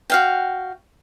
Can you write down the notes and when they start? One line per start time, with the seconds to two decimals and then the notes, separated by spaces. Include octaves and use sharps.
0.10 F#4 F5 G5